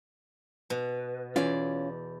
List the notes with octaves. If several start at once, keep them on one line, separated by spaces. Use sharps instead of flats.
B2
E2 C#4 F4 D5